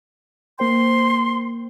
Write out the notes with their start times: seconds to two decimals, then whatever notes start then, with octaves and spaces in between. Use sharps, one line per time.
0.59 A#3 C5 G5 C6